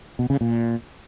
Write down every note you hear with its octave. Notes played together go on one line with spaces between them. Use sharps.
B2
C#3
A#2